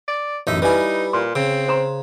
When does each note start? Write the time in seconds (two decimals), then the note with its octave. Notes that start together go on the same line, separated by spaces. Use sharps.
0.08 D5
0.47 A1 F#2 D#4 E5
0.62 G3 D#4 E4 B4 G#5
1.13 A#2 C6
1.35 C#3 C4
1.68 C5 A#5 C6